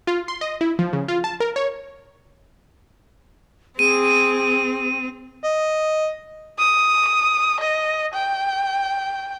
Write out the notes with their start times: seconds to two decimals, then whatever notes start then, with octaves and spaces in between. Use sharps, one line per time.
0.07 F4
0.28 C6
0.41 D#5
0.61 E4
0.79 F3
0.93 C#3
1.08 F4
1.24 A5
1.40 A#4
1.56 C#5
3.79 C4 G#4 D#7
5.44 D#5
6.58 D#6
7.60 D#5
8.14 G5